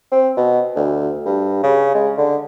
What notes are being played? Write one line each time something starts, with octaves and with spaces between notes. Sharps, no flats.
C4
B2
D2
G2
C#3
G#3
D3